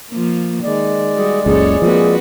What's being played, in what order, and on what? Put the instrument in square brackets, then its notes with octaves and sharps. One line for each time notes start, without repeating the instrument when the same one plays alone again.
[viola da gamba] F3 A#3
[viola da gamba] D#3 [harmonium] G#3 D5
[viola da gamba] G3 F#4 [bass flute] G#4
[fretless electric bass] F#1 C#2 [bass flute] G#4 [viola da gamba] A4 C#5
[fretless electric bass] F3 A#3 [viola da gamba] C4 F#4 B4